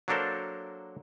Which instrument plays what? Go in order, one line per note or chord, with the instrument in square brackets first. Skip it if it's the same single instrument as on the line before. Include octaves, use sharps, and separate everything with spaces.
[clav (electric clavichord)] F#3 A#3 D4 A4 A#4 C5